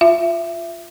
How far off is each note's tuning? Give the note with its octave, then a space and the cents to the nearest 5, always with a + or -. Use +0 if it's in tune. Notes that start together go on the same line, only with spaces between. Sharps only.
F4 +0 E5 +20